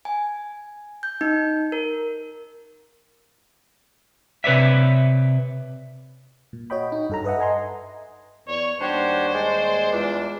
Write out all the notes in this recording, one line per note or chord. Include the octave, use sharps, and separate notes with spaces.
G#5
G6
D#4
A#4
C3 B4 C#5 D5 E5
A#2
F#4 C#5 D#5 G5 B5
D#4
G2 A4 A#5
A4 B4 D#5 E5 F#5
D#5 G#5 A#5 C6
E2 C#5 D5
D#2 G3 D4 F#4 G4 C5 C#5
G#3 D5
E2 G#3 D4 F4